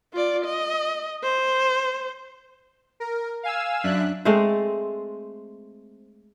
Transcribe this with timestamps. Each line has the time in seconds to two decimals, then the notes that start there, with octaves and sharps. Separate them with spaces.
0.13 F4 D5
0.45 D#5
1.23 C5
3.00 A#4
3.43 F5 G#5 E6
3.84 F#2 D4 E5 F#6
4.25 G#3 A3 C4 C5